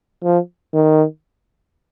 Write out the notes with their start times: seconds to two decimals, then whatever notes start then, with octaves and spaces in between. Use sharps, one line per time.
0.23 F3
0.74 D#3